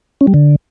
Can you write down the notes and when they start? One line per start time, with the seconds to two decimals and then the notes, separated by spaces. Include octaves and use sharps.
0.21 C#4
0.27 G3
0.34 D3